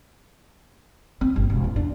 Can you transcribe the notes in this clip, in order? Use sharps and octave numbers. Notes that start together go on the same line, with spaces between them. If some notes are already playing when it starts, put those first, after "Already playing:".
C4
G1
E1
E2
D4